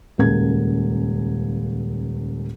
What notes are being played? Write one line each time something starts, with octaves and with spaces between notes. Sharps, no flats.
D#1 C#2 A#4 G#6